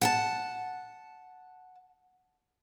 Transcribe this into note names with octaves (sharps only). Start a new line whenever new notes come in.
F#5 G5 A5